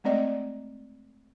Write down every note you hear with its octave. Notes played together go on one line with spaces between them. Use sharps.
G#3 A3 C4 D5 D#5